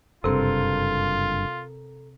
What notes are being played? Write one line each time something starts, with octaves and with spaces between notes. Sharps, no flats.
F#1 G2 C3 C4 F4 A4 A#4